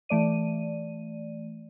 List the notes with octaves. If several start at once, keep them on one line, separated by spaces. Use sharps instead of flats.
E3 A3 D5 D#7